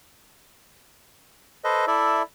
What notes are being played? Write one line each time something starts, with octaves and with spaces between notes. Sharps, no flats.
A4 B4 C5 D#5
E4 A4 D5 E5